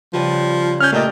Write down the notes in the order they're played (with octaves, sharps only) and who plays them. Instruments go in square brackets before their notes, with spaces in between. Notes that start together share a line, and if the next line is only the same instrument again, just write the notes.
[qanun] C#3 G3 B4 [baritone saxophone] F3
[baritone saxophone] C#4 [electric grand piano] F6 G6
[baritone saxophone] A#2 [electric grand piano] A3 D#5 [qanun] G4 D5